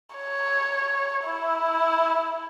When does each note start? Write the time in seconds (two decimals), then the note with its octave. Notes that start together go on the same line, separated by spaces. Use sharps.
0.16 C#5
1.25 E4